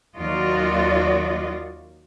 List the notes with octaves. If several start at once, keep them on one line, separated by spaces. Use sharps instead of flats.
D#2 F#3 F4 F#4 D5 D#5